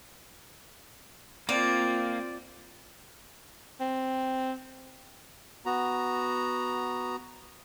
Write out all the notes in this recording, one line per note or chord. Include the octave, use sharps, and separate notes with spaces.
A#3 C4 F4 D5
C4
B3 F#4 A#5